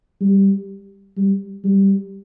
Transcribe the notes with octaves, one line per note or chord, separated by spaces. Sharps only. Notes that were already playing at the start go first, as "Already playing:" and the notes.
G3
G3
G3